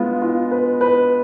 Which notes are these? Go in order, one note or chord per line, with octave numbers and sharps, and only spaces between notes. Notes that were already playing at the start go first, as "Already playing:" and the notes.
Already playing: G#3 B3 F4
F4
B4
B4